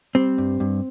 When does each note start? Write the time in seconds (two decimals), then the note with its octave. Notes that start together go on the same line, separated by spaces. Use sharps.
0.15 G3 C4
0.38 G2
0.60 G2